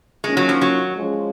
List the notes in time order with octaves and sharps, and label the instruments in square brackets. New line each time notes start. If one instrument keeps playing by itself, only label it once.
[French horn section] D#3 A#3 C#4 F4 [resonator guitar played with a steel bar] G#3
[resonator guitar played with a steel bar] F#3
F3
F#3
[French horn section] F3 G#3 C#4